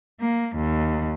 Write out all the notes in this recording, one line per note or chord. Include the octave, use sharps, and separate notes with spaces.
A#3
D#2